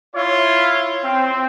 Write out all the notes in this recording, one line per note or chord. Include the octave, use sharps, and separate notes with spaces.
E4 F4 C#5
C4